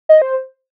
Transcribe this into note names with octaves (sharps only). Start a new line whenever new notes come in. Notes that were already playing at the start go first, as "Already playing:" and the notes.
D#5
C5